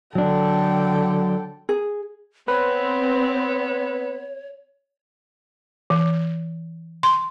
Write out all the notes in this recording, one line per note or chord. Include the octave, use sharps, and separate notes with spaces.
D3 F#3 D4 A4 G5
G#4
B3 C4 B4 C#5
E3
C6